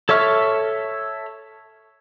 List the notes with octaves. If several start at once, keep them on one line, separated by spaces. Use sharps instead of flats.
A4 C#5 E5 C#6 F6